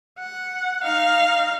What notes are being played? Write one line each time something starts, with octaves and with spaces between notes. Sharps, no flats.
F#5
D#4 F5